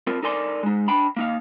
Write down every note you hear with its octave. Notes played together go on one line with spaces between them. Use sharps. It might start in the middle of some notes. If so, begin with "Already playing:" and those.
C4 F4 A#4
D#4 A4 A#4 D5 G#5 C6
G#3 D#4
D4 G5 B5
A#3 D#4 F5